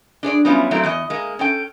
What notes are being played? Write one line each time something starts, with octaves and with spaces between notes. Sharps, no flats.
D4 G#4 C#5 D5
F#3 G3 B3 C#4 E4 F4
F#3 A3 A#3 C4 E4
E2 E3 D#5
G#3 A#3
C#4 A4 G5